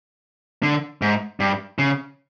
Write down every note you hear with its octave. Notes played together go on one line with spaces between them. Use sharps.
D3
G#2
G2
C#3